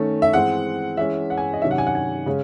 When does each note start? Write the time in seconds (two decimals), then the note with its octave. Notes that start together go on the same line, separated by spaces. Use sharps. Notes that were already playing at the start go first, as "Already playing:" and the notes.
Already playing: D#3 A3 C#4
0.22 E5
0.33 E3 G#3 C4 F#5
0.97 E3 G#3 C#4 E5
1.30 F#5
1.37 G#5
1.53 D#5
1.62 C3 D#3 F#3 C#4 E5
1.71 F#5
1.78 G#5
1.87 F#5
1.95 G#5
2.26 C#3 G#3 C#4